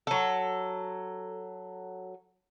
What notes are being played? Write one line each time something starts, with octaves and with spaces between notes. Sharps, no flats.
F#3 A4